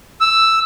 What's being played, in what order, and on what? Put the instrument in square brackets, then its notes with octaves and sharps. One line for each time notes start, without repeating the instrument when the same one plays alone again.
[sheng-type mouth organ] E6